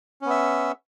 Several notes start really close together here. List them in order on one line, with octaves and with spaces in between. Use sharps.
C#4 B3 E5